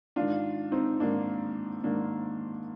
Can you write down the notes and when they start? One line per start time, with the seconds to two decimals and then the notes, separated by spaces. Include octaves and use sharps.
0.16 G#2 D#3 D4 F4
0.72 C4 D#4
1.00 G#2 D#3 A#3 D4
1.84 G#2 D#3 A#3 D4